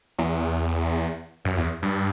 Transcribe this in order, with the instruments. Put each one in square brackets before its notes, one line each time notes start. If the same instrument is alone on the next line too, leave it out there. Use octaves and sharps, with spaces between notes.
[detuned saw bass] E2
F#2
E2
G2